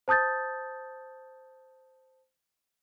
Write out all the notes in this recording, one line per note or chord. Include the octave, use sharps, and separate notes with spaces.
C5 A5 D#6 G6 A6